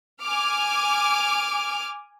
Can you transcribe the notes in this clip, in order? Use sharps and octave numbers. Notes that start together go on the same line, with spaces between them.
G#5 D6 F6